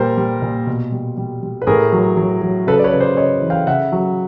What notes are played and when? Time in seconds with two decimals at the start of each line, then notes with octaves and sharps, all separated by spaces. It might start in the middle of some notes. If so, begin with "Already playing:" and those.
Already playing: A#2 G3 A#4 C5
0.17 G3
0.42 A#2
0.67 B2
0.92 G3
1.17 G3
1.43 G3
1.62 B4
1.67 A2 G#4 A#4
1.92 F#3
2.17 F#3
2.42 F#3
2.67 C#3 A4 B4
2.79 D5
2.84 B4 C#5
2.93 C#3
3.00 C5 D5
3.17 C#3 C#5 D#5
3.42 E3
3.50 F5 G5
3.67 C#3 E5 F#5
3.92 F#3